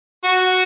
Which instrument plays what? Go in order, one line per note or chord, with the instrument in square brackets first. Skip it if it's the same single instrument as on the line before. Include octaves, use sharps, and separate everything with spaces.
[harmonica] F#4